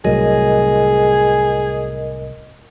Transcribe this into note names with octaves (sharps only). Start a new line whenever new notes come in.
C2 A2 F#3 G#4 A#4 D#5